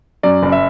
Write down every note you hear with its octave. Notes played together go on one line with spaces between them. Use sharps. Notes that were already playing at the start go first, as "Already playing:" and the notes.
F#2 D5
F#1
E5